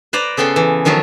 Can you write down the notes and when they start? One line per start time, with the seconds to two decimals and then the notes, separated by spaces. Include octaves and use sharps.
0.13 B4 C5 D5 A#5
0.37 C#3 B3 A4 G5 C6
0.56 E3
0.85 D#3 F3 F#3 F4